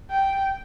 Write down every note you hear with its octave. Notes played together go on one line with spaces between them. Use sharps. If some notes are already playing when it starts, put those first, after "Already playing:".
G5